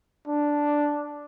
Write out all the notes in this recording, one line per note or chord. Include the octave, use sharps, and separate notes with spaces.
D4